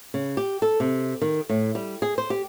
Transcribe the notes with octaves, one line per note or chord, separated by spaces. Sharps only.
C#3
G4
A4
C3
D#3
A2
G3
G#4
C5
G4